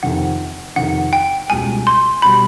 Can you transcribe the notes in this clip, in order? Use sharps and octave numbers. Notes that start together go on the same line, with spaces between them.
F2 C3 D#3 F#5
F2 C3 D#3 F#5
G5
C#2 B2 G3 G#5
C6
B2 G3 B5